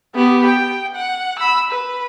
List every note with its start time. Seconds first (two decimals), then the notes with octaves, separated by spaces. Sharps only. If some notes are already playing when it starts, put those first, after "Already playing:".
0.15 B3 G4
0.46 G5
0.95 F#5
1.39 B5 E6
1.70 B4